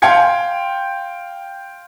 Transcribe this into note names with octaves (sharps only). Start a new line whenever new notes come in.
F5 G5 C6 G#6 C#7